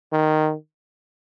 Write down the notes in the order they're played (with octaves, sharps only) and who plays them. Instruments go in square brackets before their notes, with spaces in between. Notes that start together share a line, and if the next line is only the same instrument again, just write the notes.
[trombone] D#3